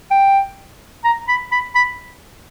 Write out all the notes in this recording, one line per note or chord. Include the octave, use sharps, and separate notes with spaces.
G5
A#5
B5
B5
B5